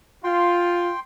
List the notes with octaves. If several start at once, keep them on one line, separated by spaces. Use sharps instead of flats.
F4 G5 C6